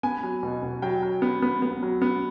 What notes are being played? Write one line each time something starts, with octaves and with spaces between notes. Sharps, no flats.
B3 G#5
F#3
B2
B2
F#3 G5
F#3
B3
B3
B3
F#3
B3